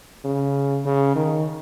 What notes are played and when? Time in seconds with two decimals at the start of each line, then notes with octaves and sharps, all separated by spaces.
0.24 C#3
0.85 C#3
1.16 D#3